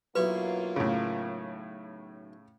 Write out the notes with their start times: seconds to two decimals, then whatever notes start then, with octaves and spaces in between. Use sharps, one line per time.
0.15 B1 F#3 A#3 E4 F4 B4 C#6
0.76 A2 C#3